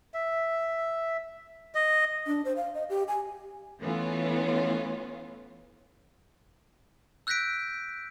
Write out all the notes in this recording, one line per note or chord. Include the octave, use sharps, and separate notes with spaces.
E5
D#5
D4
C5
F5
D#5
G4
G#5
E3 A3 B3 C#4 F4
E6 F#6 G6 A#6 B6 D7